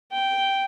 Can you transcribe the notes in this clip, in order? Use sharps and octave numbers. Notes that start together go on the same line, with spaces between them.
G5